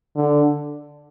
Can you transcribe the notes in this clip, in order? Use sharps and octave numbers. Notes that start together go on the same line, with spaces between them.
D3